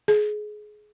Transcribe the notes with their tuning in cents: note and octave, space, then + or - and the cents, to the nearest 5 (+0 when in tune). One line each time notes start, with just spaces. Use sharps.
G#4 +25